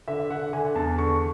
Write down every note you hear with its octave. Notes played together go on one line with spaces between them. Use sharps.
D3 E5
D3 F#5
D3 G#5
E2 A5
D3 C#6